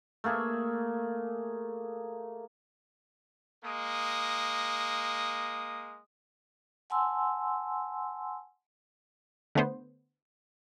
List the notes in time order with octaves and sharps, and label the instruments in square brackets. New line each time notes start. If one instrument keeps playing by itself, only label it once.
[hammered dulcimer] A3 A#3 G#4 E5
[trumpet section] G#3 A#3 D#6
[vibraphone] F#5 G#5 A5 C6 E6
[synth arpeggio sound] D3 A3 B3 C5